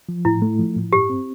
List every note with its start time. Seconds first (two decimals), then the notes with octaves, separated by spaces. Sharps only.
0.09 F3
0.25 A2 E4
0.42 A3
0.59 F3
0.76 A2
0.93 G2 G4
1.09 C4